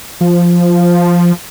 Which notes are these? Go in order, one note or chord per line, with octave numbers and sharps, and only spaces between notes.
F3